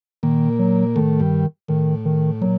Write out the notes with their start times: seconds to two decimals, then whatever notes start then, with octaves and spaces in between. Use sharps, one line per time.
0.23 A#2 D#3 A#3
0.59 F#3
0.96 A2 D#3 A3
1.20 G2 G3
1.68 A2 D#3
2.05 D#3
2.41 A#2 F#3